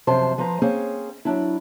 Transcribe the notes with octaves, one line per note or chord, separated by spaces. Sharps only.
F#2 C3 F3 C5 A5
F3 B4 C5 A#5
A#3 C4 C#4 G#4 C5
F#3 D4 E4